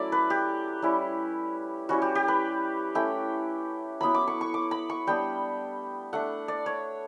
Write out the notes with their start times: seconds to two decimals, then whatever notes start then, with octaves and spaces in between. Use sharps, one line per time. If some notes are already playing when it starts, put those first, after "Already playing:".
Already playing: F#3 A3 C#4 E4 D5
0.12 B4
0.30 G4
0.82 G3 C#4 E4
1.89 G3 C#4 E4 F#4
2.02 G4
2.15 G4
2.28 B4
2.95 A3 C#4 E4 G5
4.01 F#3 B3 E4 B5
4.14 D6
4.28 C#6
4.41 C#6
4.54 D6
4.71 B5
4.90 C#6
5.07 G3 B3 D4 G5
6.13 A3 D4 F#5
6.48 D5
6.66 C#5